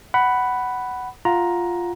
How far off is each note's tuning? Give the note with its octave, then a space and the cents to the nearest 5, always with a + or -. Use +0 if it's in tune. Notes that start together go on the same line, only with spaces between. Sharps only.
F#5 +15 B5 +0
F4 +0 F#5 +0 A#5 +10